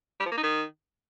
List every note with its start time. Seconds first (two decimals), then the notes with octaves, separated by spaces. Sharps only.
0.20 G3
0.26 F3
0.32 A#3
0.37 D#4
0.43 D#3